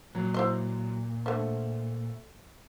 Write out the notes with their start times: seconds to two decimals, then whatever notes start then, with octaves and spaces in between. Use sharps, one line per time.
0.15 A#2 F#3
0.34 E4 C5 D#5
1.26 D3 F3 A3